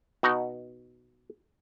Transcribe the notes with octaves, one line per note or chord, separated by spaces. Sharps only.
B2 D#4 F#4